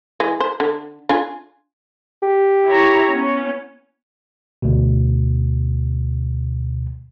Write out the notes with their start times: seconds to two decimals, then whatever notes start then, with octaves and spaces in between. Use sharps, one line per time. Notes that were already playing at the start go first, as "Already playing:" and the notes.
0.20 E3 G#3
0.40 C5
0.60 D3
1.09 D4 F4 G#5
2.23 G4
2.67 E4 C#5 A#5
3.11 B3 C#4
4.62 D2 B2